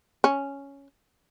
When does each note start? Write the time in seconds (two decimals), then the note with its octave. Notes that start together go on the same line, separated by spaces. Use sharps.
0.24 C#4